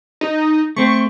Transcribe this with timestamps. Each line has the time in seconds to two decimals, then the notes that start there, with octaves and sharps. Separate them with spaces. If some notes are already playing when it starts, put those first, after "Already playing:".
0.21 D#4
0.76 A3 C4 C#6